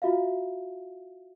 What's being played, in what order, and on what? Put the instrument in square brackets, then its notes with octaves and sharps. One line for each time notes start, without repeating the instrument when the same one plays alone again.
[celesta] F4 F#4 E5 F5